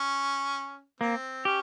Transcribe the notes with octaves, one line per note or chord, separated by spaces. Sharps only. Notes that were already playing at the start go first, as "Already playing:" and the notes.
Already playing: C#4
A#3 C4
C#4 G4